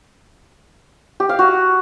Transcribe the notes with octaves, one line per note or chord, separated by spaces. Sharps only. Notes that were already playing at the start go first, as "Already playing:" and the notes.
G4
F5
F#4